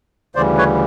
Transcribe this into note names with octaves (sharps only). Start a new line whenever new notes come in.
D2 C#3 E3 G3 C5 D5
B4 C#5